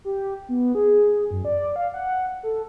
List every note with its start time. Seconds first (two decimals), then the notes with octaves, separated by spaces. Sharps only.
0.05 G4
0.49 B3
0.75 G#4
1.31 F#2
1.45 D5
1.76 F5
1.94 F#5
2.43 A4